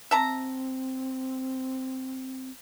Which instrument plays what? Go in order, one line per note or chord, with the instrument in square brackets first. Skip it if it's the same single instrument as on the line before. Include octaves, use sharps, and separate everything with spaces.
[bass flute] C4 [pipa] E5 A5 A#5